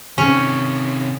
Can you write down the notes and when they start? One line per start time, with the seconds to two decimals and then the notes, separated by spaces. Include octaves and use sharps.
0.18 C3 D#3 C#4